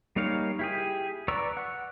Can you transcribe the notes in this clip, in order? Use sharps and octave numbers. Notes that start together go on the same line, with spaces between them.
G3 A#3 D#4 C#5 F5
E4 G4 G#4
B4 D5 A#5 C#6 E6
F#5